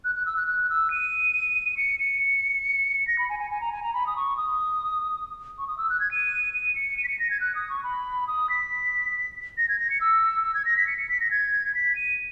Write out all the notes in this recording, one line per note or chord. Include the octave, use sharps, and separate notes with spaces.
F#6
F#6
E6
F#6
F#6
E6
D#7
C#7
C#7
A#6
B5
G#5
G#5
G#5
A#5
G#5
A#5
B5
D#6
C#6
D#6
C#6
D#6
E6
F#6
G#6
D#7
D#7
C#7
D#7
B6
C#7
A#6
G#6
F#6
D#6
C#6
B5
D#6
B6
A#6
G#6
A#6
C#7
E6
E6
G#6
A#6
B6
C#7
C#7
B6
A#6
G#6
B6
D#7